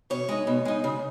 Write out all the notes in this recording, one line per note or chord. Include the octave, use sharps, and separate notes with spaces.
B2 C#5
G#3 D#4
B2
G#3 D#4
C#3